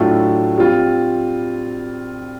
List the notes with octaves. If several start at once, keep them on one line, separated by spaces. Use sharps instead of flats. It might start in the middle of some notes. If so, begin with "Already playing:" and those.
Already playing: A2 F#3 A3 D4 F4
G3 C4 F4